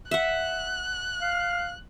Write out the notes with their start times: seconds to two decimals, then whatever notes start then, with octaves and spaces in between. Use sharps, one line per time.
0.11 E5 F#5 F#6
1.21 F5